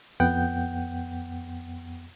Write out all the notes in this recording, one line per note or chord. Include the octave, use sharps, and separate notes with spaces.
F2 B3 F#5 G5 G6